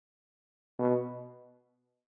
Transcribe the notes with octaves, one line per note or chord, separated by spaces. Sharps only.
B2